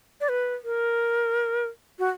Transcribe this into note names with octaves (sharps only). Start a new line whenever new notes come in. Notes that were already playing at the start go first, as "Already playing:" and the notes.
D5
B4
A#4
F#4